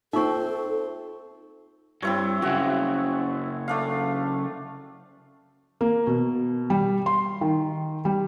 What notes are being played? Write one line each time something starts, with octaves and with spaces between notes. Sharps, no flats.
C4 D#4 F4 A4 E5 C#6
G2 C4 E4 C#5
F#2 C#3 F#4 E5 F#5
A3 D4 F5
A#3
B2
G3
C6
D#3
G3